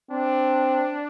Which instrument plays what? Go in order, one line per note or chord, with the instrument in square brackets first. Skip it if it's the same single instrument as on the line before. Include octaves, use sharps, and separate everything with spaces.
[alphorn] C4 [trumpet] D4